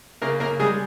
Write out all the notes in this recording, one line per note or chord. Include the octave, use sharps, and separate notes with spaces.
C#3 A#3 A#4
A#3 A#4
G3 G#3 G#4